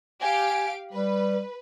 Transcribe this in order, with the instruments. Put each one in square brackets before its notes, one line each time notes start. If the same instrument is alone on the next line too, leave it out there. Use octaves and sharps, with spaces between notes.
[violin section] G4 F5 D7 [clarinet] G#5
[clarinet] G3 [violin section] B4